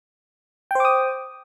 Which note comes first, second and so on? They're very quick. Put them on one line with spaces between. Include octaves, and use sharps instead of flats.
G5 C5 D6 D#6